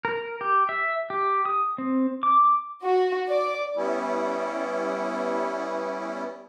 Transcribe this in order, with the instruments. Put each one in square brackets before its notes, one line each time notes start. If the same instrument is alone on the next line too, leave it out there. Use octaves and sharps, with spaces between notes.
[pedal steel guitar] A#4
G4
E5
G4
D#6
C4
D6
[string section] F#4
D5
[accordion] G3 B3 C#4 E4